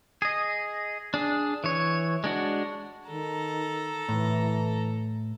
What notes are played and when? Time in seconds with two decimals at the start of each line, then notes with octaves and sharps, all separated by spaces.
0.22 G#4 D#5
1.14 D4 G#4
1.64 E3 C#5
2.24 G#3 D4 F#4
3.08 D#3 A4 A#5
4.09 A2 E3